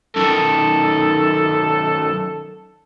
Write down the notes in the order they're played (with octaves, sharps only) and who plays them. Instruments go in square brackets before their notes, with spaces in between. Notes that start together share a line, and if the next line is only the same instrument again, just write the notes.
[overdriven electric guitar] F#2 D#3 [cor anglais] A4